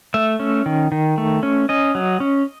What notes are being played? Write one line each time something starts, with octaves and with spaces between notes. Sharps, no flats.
A3 E5
C#4
D#3
D#3
A3
C#4
C#4 D#5
F#3
C#4